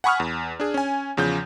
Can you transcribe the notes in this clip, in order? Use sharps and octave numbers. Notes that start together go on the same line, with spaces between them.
F#5 G#5 B5 C#6 D#6 F6
E2
D4 G#4
C#4 G#5
E2 C#3 F3 G6